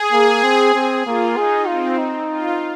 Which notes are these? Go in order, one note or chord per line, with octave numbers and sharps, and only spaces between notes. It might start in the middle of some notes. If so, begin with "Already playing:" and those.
Already playing: G#4
A#3
C4
C4
A#3 F4
D#4 G#4
C4 F4
D#4
F4